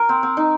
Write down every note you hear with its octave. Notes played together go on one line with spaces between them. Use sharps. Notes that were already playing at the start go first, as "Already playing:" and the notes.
Already playing: A#4
C4
C4
D#4